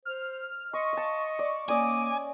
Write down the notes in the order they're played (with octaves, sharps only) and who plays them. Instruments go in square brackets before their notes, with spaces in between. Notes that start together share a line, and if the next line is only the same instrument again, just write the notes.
[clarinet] C5 [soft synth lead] F6
[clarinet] D#5 [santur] C6 [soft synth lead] C#6
[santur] F5 A5
D5
[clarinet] A#3 [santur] C#4 D5 D#5 [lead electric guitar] G#5 [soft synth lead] D6